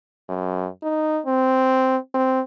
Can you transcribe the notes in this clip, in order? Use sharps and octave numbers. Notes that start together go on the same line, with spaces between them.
F#2
D#4
C4
C4